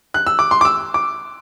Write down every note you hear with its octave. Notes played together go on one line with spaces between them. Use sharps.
F#6
E6
D6
C6
D6
E6
D6